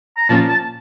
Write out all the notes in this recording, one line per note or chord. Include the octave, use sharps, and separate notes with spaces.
A#5
A#2 F3 A#3 C#4 A5
A5